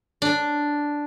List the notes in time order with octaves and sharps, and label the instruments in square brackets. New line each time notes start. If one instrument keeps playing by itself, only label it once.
[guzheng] D4